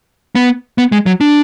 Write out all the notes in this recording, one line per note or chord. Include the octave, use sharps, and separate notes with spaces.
B3
B3
G#3
F#3
D4